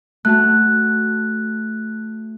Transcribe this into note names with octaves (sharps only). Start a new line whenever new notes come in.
A3 F#4 A5 F#6